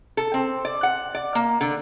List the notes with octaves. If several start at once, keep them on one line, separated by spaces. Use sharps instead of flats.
A4
C4
D5
F#5
D5
A#3
D3